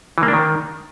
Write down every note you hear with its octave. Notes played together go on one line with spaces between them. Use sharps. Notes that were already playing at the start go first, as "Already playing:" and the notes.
E3
A#3
D4
D#3